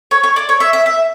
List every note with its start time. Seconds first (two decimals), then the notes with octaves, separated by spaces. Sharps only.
0.11 C#5
0.24 C#5
0.36 D5
0.49 C#5
0.60 E5
0.73 E5
0.86 E5